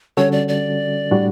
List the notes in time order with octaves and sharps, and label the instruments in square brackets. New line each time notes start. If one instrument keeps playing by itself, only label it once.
[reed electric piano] D3 G3 C#4 F#4 A4 [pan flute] C#5
[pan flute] D5
D5
[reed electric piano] A2 G3 D4 F#4